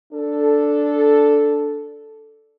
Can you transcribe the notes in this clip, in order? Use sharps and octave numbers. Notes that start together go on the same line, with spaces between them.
D4 A4